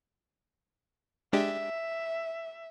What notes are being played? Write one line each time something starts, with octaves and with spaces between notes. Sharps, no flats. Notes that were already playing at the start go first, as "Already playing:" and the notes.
G#3 D4 G4 E5